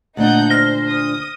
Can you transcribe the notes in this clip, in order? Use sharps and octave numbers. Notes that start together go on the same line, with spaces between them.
D2 A#2 D4 D#4 F#5 G6
C5 F6 A#6 G7
D#6